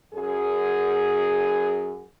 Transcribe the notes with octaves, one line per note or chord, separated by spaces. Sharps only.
F#2 G#4